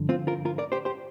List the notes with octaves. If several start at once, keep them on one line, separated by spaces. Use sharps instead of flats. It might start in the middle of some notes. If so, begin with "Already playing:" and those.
Already playing: G2 D3 F3
C4 F4
F4 A#4
F4 A#4
A#4 D5
G4 C5
G4 C5